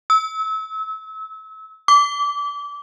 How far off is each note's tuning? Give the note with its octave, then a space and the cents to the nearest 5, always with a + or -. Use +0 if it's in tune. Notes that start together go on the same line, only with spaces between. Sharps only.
E6 -30
D6 -25